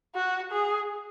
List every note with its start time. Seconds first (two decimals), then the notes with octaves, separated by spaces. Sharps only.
0.15 F#4
0.52 G#4